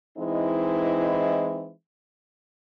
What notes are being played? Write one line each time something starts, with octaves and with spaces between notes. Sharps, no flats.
E3 G#3 C4 D#4 E4